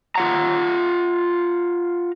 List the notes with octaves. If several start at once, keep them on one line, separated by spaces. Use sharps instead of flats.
F4 F#5 A#5